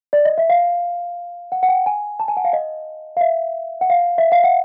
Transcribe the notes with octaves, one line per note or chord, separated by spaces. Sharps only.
D5
D#5
E5
F5
F#5
F#5
G5
G#5
A5
G#5
F#5
F5
D#5
F5
E5
F#5
F5
E5
F5
F#5